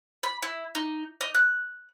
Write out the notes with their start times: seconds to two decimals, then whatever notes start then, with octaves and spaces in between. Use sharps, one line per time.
0.23 B5
0.42 E4
0.75 D#4
1.21 D#4
1.34 F#6